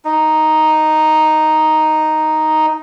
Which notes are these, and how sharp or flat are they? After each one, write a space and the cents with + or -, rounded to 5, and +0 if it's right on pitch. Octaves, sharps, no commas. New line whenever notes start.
D#4 -5